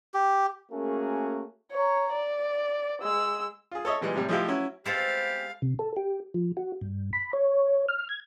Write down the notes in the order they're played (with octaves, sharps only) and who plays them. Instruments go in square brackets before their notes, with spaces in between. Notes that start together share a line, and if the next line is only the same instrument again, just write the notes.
[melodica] G4
[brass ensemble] A3 A#3 C#4 F#4 G#4 A#4
[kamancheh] C#5 A#5
D5
G#3 E6
[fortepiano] F4 G#4
A4 C#5 D#5 E5
A#2 E3 G3 G#3
A2 C3 G3
F3 G#3 A3 E4 F4 G4
F#3 C#4 E4 F#4
[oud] G#3 B3 C4 [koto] E4 F4 A4 [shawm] G4 [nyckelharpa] F5
[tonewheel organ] C3
A4
G4
F3
F#4
G2
B5
C#5
F6
G#6